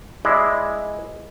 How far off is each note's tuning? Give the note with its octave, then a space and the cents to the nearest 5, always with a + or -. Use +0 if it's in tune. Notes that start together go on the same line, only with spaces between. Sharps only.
G#3 +0 E4 +0 D5 +10